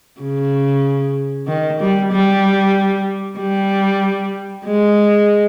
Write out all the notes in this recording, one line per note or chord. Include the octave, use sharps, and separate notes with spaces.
C#3
D#3
G3
G3
G3
G#3